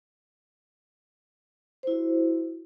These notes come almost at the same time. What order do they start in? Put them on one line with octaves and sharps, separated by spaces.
C5 E4 F#4